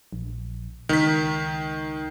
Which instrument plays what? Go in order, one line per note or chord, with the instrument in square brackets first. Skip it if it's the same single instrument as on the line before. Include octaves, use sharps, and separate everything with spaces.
[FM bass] A#1
[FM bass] C#2 [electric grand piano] D#3 B6